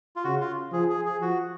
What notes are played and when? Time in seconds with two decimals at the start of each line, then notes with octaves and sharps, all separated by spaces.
0.16 F4
0.24 C#3 F#4
0.40 F4
0.72 F3 G#4
0.89 G#4
1.06 G#4
1.21 F3 F#4